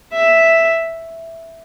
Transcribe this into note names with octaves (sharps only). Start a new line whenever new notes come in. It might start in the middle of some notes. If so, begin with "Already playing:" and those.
E5